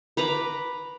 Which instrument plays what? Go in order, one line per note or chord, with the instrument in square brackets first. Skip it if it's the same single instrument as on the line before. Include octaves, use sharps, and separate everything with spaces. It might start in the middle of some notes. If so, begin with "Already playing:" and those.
[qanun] B4 A#5 B5 D6